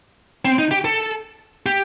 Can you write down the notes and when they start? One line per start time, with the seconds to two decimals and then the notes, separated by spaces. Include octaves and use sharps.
0.45 C4
0.59 D#4
0.71 G4
0.85 A4
1.66 G4